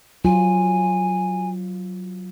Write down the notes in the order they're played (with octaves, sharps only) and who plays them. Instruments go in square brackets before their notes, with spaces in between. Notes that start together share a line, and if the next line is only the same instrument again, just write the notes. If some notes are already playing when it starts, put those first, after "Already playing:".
[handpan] F#3 F4 [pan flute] G#5